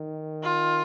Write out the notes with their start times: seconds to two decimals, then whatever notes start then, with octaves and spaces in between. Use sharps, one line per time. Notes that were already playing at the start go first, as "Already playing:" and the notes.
Already playing: D#3
0.43 F4